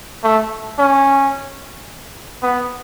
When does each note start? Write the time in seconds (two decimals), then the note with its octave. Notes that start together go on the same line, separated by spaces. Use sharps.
0.24 A3
0.79 C#4
2.43 B3